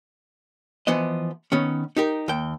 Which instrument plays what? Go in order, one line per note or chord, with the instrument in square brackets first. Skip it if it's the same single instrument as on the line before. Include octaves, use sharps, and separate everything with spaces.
[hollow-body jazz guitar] E3 F3 B3 C5 D#5
D#3 B3 C#4
D#4 G4 A#4
D#2 G5